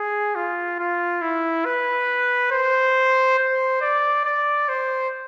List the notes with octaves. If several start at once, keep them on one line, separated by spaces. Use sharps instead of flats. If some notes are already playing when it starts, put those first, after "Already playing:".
Already playing: G#4
F4
F4
E4
B4
C5
C5
D5
D5
C5